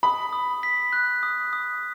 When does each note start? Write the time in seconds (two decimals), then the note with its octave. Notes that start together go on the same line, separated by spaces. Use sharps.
0.03 B5 D#6
0.33 D#6
0.63 B6
0.93 F#6
1.23 D#6
1.53 D#6